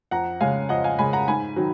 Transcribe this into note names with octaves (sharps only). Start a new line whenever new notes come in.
F2 F#5 A#5
C#3 G#3 F5 G#5
F2 D#5 F#5
F5 G#5
C#3 G#3 G#5 B5
F#5 A#5
G#2 G#5 B5
D#3 F#3